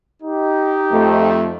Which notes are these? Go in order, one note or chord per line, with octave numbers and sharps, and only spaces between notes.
D#4 G4
F2 A3